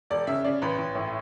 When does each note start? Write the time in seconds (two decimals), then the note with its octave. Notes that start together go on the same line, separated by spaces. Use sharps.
0.10 E1 D5
0.27 C#3 E5
0.44 C#3 D5
0.62 A1 B4
0.78 A1
0.95 A2